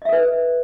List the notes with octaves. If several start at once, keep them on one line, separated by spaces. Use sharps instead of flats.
A4 B4 D#5 E5